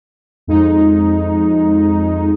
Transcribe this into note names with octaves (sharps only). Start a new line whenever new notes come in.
F2 G#3 D#4